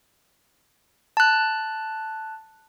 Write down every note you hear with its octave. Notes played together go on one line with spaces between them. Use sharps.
A5 F#6